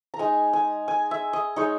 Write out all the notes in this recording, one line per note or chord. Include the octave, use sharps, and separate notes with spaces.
A#5
G#3 D#4 G#5
G#5
G#5
E5
D#5
G#3 D#4 C#5